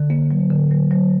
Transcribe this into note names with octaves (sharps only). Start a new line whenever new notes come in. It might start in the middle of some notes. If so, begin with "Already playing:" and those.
Already playing: D3
A#3
F#3
D3
F#3
F#3